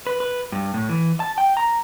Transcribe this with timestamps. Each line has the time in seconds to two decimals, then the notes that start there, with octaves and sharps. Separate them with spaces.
0.07 B4
0.20 B4
0.52 G2
0.74 A2
0.89 E3
1.20 A5
1.38 G5
1.57 A#5